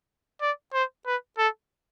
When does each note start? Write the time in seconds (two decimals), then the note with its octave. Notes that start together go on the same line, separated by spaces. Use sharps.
0.42 D5
0.74 C5
1.07 B4
1.38 A4